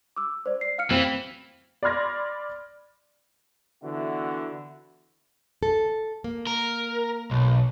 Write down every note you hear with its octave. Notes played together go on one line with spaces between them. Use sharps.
D6 E6
C5 D5
C7
F5 F6 C#7
E3 C4
D5 B5 C6 F6 G#6 A#6
D3 E3 B3 E4 F#4
A4
A#3
A#4
B1